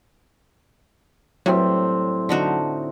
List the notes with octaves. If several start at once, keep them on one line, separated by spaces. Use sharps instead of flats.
A2 F#3 G3 C4
D3 D#4 F#4